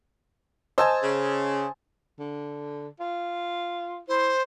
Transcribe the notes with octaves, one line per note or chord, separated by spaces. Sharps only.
C5 D#5 G#5 A5 E6
C#3
D3
F4
E4 C5